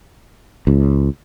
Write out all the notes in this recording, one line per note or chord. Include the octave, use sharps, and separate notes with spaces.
C#2